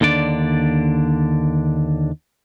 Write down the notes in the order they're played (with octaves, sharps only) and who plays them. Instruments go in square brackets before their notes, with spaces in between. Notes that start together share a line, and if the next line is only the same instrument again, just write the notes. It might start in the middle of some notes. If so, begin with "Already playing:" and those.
[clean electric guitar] D#2 D3 D4 D5